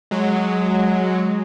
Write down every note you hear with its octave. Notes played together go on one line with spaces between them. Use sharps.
F#3 G#3